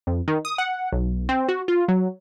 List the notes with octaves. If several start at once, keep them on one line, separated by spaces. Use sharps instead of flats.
F2
D#3
D#6
F#5
B1
C4
F#4
F4
F#3